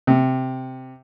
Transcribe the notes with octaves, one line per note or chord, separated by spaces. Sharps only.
C3